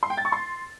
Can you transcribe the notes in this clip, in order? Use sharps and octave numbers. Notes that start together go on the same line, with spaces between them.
C6
G5
A6
C#6
C6